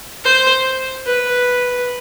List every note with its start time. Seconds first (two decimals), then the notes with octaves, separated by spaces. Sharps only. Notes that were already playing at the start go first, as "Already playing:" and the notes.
0.25 C5
1.07 B4